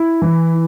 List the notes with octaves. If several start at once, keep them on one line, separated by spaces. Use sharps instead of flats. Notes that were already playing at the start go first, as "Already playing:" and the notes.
Already playing: E4
E3